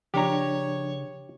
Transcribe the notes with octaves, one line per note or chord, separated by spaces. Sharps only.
C#3 F3 D4 G4 C#5 A#5